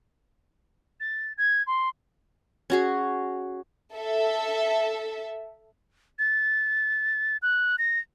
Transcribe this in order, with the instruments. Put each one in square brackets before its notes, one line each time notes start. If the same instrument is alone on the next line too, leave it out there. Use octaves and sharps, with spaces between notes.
[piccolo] A6
G#6
C6
[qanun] C#4 F#4 G#4
[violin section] A4 E5
[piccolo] A6
F#6
A#6